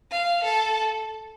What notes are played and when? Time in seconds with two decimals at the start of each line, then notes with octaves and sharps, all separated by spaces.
0.11 F5
0.44 A4